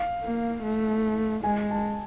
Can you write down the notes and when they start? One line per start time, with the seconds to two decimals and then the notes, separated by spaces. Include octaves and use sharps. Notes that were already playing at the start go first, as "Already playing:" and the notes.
Already playing: F5
0.24 A#3
0.63 A3
1.44 G#3 G#5
1.71 A5